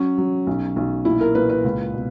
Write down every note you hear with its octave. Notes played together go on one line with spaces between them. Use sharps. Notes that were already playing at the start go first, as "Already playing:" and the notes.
Already playing: F#3 C#4
F#3
B1
B1
A#2 E4
A#4
A#2 B4
B4
C#2
B2